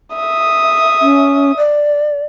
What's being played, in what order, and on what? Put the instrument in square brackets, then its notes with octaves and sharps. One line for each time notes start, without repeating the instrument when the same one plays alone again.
[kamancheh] E5 D#6
[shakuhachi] C#4
D5